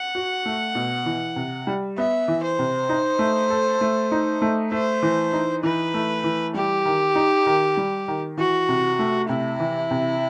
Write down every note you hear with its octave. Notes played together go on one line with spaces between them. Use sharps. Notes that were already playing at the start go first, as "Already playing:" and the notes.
Already playing: F#5
F#4
A3
B2
E3
C3
G3
B3 E5
E3
C5
C3
D#4
A3
A4
A3
D#4
A3
A3 C5
E3
D#4
E3 B4
A3
E3
G3 G4
D#3
D#4
D#3
G3
D#3
E3 F#4
C3
A3
C3 E4
E3
C3